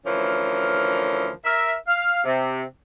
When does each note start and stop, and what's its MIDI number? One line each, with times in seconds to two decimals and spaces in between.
0.06 1.29 38
0.06 1.29 52
0.06 1.29 53
0.06 1.29 61
0.06 1.29 70
1.45 1.74 70
1.45 1.74 76
1.87 2.22 77
2.25 2.63 48